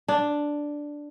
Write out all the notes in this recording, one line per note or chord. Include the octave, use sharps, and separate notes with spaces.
D4